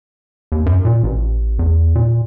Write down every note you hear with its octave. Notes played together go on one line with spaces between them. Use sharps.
D#2
F#2
A#2
A1
E2
A#2